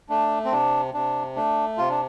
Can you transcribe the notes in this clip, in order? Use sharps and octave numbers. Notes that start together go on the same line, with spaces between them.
A3 D4
C4
C3 D4
C3 D4
A3 D4
C3 F4
D4